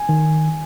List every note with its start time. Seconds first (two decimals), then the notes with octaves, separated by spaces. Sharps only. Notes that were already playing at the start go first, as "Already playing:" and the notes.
Already playing: G#5
0.09 D#3